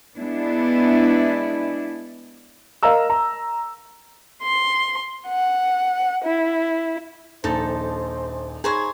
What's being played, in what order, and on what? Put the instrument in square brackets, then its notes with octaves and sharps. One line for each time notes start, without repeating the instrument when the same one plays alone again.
[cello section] G#3 B3 D4 E4
[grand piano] A#4 D#5 F5 A#5 E6
A#5
[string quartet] C6
F#5
E4
[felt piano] D#1 A#1 A6 [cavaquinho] D#4 [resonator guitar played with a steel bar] A4 [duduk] C5
[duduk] D#4 [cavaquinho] G#4 C5 C#5 [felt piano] A#5 B5 G#6